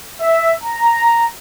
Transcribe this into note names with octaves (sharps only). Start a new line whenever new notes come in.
E5
A#5